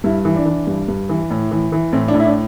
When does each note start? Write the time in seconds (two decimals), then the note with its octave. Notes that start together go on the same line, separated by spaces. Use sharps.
0.04 G2 E4
0.25 E3
0.36 D4
0.46 E3
0.67 G2
0.88 G2
1.09 E3
1.30 A2
1.51 E3
1.72 E3
1.93 A2 C4
2.08 D4
2.14 A2
2.20 E4
2.25 D4